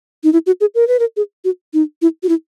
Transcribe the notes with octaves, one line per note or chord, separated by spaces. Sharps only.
D#4
E4
F#4
G#4
A#4
B4
A#4
G#4
F#4
D#4
E4
F#4
E4